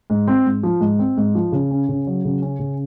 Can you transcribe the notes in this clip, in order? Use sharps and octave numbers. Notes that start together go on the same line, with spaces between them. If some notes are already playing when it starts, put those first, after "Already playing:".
G#2
C4
G#2
F3
G#2
C4
G#2
F3
C#3
C#4
C#3
F#3
C#3
C#4
C#3